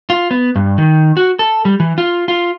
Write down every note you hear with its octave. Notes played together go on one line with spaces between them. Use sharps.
F4
B3
G2
D#3
F#4
A4
G3
E3
F4
F4